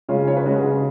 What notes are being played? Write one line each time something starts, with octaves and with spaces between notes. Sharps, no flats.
C#3 G#3 C#4 F4
C#3 C#5
B4
G#3 C#4 F#4
G#4
C#3